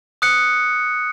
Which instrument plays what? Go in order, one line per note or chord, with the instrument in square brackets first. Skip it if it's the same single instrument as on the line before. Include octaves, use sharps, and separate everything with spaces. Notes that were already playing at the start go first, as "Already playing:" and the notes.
[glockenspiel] D#6 F#6 C#7